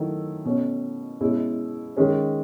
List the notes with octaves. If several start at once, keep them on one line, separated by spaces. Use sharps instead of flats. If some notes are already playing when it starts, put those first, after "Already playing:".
Already playing: D#3 F#3 A3 E4
B2 A3 C#4
B2 G#3 C#4 E4
D#3 G#3 C#4